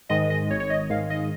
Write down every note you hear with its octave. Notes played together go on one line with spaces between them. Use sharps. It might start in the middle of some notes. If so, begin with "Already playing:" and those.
G#2 D#3 G#3 D#5
D#5
G#1 C#5
C#5
D#5
G#2 D#3 G#3 F5
D#5